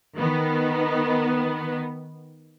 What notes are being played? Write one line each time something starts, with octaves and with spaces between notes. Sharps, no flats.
D#3 B3